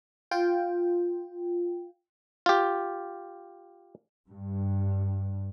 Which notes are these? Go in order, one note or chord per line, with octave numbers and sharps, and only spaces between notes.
F4 G5
F4 G4
G2